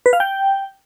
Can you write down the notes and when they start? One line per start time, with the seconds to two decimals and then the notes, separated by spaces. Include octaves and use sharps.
0.06 B4
0.13 F5
0.20 G5